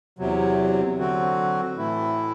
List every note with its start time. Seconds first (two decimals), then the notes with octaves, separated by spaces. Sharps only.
0.19 E2 C3 F#3
0.97 D3 F#3 C4 F#4
1.76 A2 E3 A3 E4